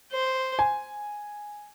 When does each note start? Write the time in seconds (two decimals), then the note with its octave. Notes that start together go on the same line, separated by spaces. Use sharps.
0.12 C5
0.59 G#5